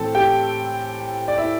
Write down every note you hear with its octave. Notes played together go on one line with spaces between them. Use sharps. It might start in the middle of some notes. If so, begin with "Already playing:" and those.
Already playing: A2 E3 C4 A4 A5
G4 G5
D5
E4 E5